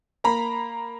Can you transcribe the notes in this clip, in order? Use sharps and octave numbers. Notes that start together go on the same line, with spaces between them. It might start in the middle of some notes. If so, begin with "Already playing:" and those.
A#3 A#5 B5